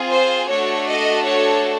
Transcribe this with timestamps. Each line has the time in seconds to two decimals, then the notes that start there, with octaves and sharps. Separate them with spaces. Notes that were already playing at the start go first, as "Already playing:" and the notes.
Already playing: C4 F4 G#4
0.10 C5
0.49 A3 D4 F#4 A4 C#5
0.88 D#5
1.27 C#5